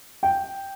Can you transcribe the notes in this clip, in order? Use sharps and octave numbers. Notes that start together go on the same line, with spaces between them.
G5